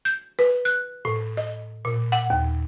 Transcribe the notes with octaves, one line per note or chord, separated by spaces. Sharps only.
G6
B4
F#6
A2
D#5
A#2
F#5
D#2